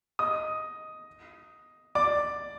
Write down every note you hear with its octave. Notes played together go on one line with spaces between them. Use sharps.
D#5 D#6
D5 D6